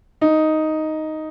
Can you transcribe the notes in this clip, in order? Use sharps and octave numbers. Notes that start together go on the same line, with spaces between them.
D#4